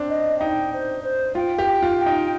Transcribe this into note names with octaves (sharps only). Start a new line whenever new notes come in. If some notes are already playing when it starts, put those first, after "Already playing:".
Already playing: C4 D4
D#5
D#4 G5
C5
C5
F4 G5
G4
G5
F4
G5
D#4